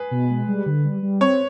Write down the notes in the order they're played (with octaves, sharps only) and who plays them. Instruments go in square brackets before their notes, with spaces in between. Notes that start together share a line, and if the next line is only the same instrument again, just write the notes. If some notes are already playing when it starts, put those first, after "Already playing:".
Already playing: [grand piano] G#4 B4
[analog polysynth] B2
G#3
G3
D3
G3
G3
[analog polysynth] C4 [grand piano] C#5